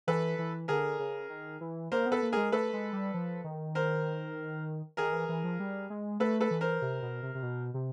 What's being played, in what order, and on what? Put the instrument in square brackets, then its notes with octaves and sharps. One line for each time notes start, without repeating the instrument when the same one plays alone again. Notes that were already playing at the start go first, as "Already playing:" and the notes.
[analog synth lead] E3 [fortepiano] A4 B4
[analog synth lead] E3
[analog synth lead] D3 [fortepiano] G#4 A#4
[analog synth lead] C#3
D#3
E3
[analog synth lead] A#3 [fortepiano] A#4 C5
[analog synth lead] B3
[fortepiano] A4 B4
[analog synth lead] A#3
[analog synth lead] G#3 [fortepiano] G#4 A#4
[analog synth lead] A3 [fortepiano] A4 B4
[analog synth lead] G#3
G3
F3
D#3
[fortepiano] A#4 C5
[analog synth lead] D#3 [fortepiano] G#4 A#4
[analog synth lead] E3
E3
F3
G3
G#3
[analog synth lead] A3 [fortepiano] A4 B4
[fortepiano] A4 B4
[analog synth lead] E3
[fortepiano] A#4 C5
[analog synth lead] C3
B2
C3
C3
B2
C3